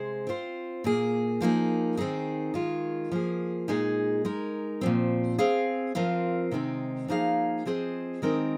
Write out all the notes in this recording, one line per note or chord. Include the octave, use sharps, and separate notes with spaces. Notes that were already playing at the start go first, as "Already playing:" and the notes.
Already playing: C3 G#3 G#4 C5
C4 F4 C5
A#2 A#3 G#4
F3 A#3 D#4 G#4
D#3 C4 D#4 G#4
D#3 G#3 F4
F3 A#3 G#4
A#2 G#3 D#4 G#4 D#5
G#3 D#4 A#4
A#2 F3 C4
C4 G#4 F5
F3 C4 F4 A#4 F5
C3 D#3 G#3 C4 D#4
F3 A#3 D#4 G#4 F5
F3 C4 G#4 C5 D#5
D#3 G#3 C4 D#4 A#4